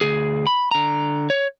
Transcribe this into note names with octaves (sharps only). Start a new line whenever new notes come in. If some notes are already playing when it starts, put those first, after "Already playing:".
D2 G#4
B5
D3 A#5
C#5